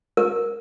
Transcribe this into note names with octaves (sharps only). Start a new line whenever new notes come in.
A#4